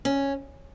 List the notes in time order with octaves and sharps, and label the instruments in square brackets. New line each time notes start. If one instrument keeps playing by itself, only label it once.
[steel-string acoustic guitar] C#4